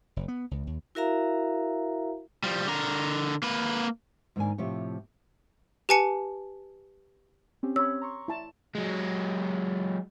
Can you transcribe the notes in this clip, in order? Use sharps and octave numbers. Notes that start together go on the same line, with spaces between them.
F#1
B3
C#2
D#2
E4 F#4 A#4 E5 F5 A#5
F3 G3
D3 A#4
A#3 B4
G#2 D#3 A#3 D4 D5 G#5
A2 C3 F3 G4 C#5 F5
G4 B4 G#5 A5 C#7
C4 C#4 G4
C#5 B5 E6
A#5 C6 C#6
E4 A5
F#3 G#3